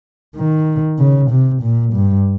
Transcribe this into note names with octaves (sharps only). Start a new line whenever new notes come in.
D#3
C#3
C3
A#2
G2